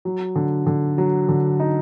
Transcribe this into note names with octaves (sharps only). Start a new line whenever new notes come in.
F#3
D3
D3
F#3
D3
D#4